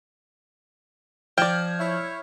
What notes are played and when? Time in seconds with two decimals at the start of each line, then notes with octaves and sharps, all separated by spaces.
1.38 F3 D5 G5 F6 G6 G#6
1.80 E4 C#5